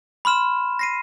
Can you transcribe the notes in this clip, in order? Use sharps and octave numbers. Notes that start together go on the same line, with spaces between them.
B5 C6 F6 E7
A#6 C7 D#7